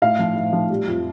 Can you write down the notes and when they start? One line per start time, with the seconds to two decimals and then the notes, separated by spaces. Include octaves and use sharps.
0.02 A2 F5
0.19 F3
0.36 A2
0.53 F3
0.70 G3
0.87 F2